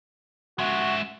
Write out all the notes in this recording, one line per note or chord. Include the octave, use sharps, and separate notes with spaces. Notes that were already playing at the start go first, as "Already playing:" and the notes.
G#3 F#4 E5